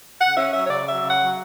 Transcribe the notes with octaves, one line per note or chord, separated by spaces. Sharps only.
C#3 F#5
C#4 E5
F#3 E5
C#5
C#3 D5
F#3 E5
C#3
F#5
F#3